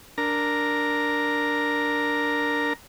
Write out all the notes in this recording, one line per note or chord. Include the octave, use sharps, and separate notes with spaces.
D4 A#4 A#5